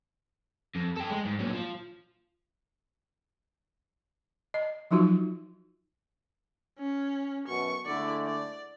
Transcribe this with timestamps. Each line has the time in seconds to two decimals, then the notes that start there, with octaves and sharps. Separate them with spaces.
0.75 F2
0.96 A4 G5
1.10 G#3
1.25 G#2
1.39 A#2 F#3
1.53 F3
4.54 D#5
4.91 F3 F#3 D#4 F4 F#4
6.79 C#4
7.48 F#2 B2 C#6
7.86 D3 G#3 A3 E4 D5
8.26 D5